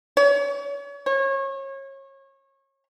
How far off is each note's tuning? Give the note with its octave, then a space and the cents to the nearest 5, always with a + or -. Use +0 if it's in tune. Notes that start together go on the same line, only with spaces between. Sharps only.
C#5 +35
C#5 -30